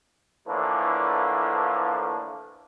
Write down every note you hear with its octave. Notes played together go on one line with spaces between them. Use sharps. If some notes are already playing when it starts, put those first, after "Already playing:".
A2 D3 E3 F3 A#3 D4